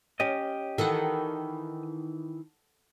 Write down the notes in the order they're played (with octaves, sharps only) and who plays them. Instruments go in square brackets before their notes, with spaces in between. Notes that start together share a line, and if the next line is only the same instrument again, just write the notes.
[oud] C#4 [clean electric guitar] G4 D#5
[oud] D#3 E3 [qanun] A4 F#5